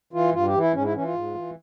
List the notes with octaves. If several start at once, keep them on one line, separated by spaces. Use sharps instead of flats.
E3 F4
G2 F4
G4
E3
E4
G#2 C#4
E4
E3 C#4
F4
G#2
E3